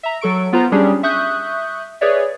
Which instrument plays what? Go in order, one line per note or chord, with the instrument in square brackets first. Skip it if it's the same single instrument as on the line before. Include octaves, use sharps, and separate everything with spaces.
[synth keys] E5 A#5
F#3 A4 C#6 D7
B3 F4 C5 A#5
G3 C#4 D4 G4 G#4
E5 C#6 D#6 F#6 G6
G#4 B4 C#5 D5 E5